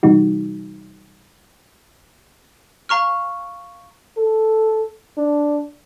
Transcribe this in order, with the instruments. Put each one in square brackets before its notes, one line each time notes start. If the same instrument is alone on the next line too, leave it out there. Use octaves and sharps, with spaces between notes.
[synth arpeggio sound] C3 E3 G3 D#4 F#4
[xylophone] F5 A#5 C#6 F6
[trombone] A4
D4